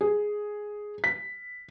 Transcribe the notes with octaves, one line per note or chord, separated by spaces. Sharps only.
G#4
B6